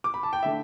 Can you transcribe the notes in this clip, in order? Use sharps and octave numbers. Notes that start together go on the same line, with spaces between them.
D6
B5
A5
G5
D3 A3 D4 E5